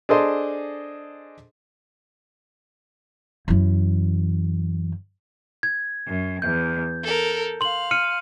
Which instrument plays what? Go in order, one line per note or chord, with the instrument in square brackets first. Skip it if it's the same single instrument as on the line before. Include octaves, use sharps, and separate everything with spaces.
[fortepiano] D4 G#4 A4 C5 D#5 C6
[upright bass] F#2 E3
[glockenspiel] G#6
[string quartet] F#2
[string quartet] E2 [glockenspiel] G6
[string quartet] A4 A#4
[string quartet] F5 [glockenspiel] C6 F#7
[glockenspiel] F6 C#7 D#7